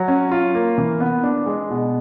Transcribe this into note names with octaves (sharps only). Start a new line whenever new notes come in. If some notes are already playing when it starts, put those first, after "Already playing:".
Already playing: F#3
C#4
F4
A#3
E3
B3
D4
G#3
B2